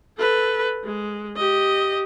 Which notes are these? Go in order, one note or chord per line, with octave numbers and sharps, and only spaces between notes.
A4 B4
G#3
G4 D#5